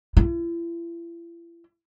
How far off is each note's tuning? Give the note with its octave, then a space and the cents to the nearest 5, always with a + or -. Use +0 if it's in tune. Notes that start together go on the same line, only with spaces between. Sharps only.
E4 +40